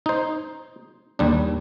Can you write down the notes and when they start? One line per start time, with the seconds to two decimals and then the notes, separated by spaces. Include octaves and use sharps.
0.06 D#4 C5
1.19 D#2 G3 D4